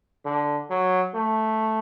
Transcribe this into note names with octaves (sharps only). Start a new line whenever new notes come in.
D3
F#3
A3